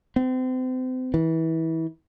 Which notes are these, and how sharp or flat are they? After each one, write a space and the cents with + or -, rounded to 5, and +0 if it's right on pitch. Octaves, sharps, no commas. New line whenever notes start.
C4 -35
E3 -25